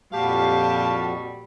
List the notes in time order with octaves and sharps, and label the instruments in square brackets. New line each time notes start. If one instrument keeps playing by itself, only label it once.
[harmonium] F2 F#4 [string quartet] A#2 G3 [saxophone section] G4 F5 [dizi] A5